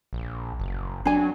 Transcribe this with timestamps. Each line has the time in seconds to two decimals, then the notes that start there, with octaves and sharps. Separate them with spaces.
0.13 A#1
0.60 F#1
1.05 F#3 D4 G#5